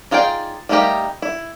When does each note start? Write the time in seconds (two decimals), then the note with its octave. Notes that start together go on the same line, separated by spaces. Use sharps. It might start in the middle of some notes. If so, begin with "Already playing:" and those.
0.11 D#4 F4 G#4 D5 G5
0.69 G3 A3 A#3 D#4 G4
1.22 E4